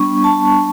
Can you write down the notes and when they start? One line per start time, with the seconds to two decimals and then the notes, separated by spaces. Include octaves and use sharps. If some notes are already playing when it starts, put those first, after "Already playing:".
Already playing: G3 B3 D4 C#6
0.24 A5